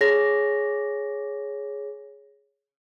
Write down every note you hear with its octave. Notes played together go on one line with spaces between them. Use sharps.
G#4 C#5 A#6